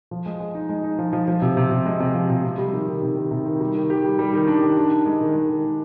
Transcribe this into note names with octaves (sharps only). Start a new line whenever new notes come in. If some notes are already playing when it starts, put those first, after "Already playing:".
F3
G#3
G#3
D#4
G#3
D#4
F3
F3
F3
C3
C3
C3
G#3
C3
F3
C3
C3
G3
D#3
D#3
C3
D#3
C3
D#3
G3
D#3
G4
G3
G3
D#3
D4
D#3
D4
D4
G#3
D#3
G#3
D#3
D#3